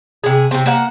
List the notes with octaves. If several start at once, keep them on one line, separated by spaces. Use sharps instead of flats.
C3 G#4
C3 C4
A#3 F#5